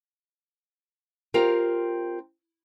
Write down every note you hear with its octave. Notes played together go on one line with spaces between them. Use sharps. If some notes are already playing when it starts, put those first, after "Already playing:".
C4 F4 G4 A#4